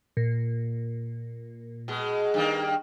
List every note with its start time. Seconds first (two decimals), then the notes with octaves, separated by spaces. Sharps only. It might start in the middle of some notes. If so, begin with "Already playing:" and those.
0.17 A#2
1.88 B2 G#3
2.34 G2 D#3 A#3